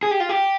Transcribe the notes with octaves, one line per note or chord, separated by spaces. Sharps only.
G#4
G4
F4
G4